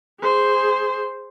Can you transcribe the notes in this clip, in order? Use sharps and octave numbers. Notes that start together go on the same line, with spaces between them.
G#4 C5